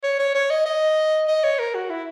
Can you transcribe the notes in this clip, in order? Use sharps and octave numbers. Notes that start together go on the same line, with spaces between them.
C#5
C#5
C#5
D#5
D#5
D#5
C#5
A#4
F#4
E4